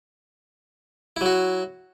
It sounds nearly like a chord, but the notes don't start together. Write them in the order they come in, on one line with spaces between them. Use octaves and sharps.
E4 F#3 F#4